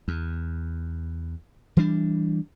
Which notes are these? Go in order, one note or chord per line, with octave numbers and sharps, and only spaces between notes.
E2
E3 G3 D4